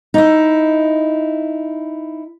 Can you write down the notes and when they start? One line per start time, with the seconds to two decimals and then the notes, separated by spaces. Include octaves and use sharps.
0.14 D#4 E4